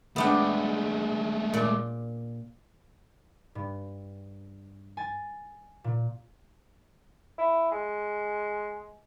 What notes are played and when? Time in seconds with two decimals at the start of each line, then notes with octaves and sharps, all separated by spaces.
0.16 G#3 A3 B3 D4 G5
1.53 A#2 D5
3.55 G2
4.97 G#5 A6
5.84 A#2
7.38 E4
7.71 G#3